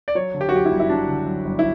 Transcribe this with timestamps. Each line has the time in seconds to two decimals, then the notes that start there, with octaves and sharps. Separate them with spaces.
0.08 D5
0.15 F#3 C#5
0.34 D3
0.41 G4
0.49 F#4
0.53 F#2 G4
0.65 E4
0.71 G1
0.80 E4
0.89 F#3 D4
1.08 D3
1.26 F#2
1.45 G1
1.59 E4